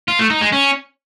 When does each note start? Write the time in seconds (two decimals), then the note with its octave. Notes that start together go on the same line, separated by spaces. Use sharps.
0.08 F4
0.19 A3
0.30 D#4
0.41 G#3
0.52 C#4